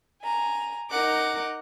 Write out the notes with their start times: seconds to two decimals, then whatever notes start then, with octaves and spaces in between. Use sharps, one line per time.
0.22 G#5 A#5
0.90 D#4 A#4 F#5 D6